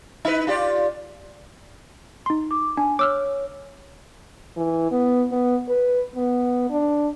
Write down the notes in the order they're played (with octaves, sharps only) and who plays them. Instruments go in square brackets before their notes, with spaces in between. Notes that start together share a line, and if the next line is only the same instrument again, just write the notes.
[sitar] D#4 B4
F4 G4 D5
[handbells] D#4 C6
[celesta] D6
[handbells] D4 [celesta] G#5
[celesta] C#5 [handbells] D6 E6 F6
[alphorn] E3
B3
B3
B4
B3
D4